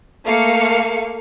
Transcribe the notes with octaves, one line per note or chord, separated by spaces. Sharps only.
A3 A#3 F5 C#7